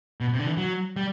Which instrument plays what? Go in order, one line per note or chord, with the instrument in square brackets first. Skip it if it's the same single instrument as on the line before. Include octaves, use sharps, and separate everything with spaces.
[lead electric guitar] B2
C3
D3
E3
F#3
G3